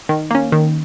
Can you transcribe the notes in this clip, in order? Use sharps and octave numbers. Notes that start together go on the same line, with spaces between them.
D#3
A#3 C#4
D#3